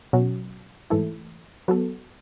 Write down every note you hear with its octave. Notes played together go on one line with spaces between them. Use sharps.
B2 F#3 C#4 F#4
G#2 E3 A3 E4 A4
F#3 B3 F#4 A4